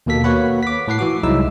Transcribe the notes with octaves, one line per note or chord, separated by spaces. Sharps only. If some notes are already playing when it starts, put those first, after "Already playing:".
D#2 B2 A#3 A4 B6
A#3 F#4 B4 C#5 F#5 B5
D6 B6
A2 B4 F#5 C7
E3 F#4 D6
C2 F#3 G#3 D#4 E4 E6